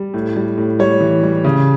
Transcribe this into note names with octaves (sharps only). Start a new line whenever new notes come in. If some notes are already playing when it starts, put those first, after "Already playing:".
Already playing: G3
A2
G3
A2
G3 C#5
E3
G3
C#3